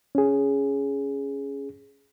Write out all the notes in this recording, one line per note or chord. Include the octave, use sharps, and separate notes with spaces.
C#4 G#4